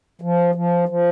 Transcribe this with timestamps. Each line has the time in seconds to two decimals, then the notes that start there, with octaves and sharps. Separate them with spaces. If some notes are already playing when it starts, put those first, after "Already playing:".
0.21 F3
0.55 F3
0.89 F3